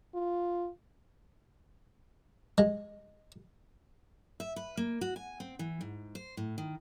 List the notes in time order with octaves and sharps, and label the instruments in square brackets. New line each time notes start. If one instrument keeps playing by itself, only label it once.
[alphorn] F4
[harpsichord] G#3
[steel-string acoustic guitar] E5
B4
A#3
F#4
G#5
C4
E3
G#2
C5
A2
D#3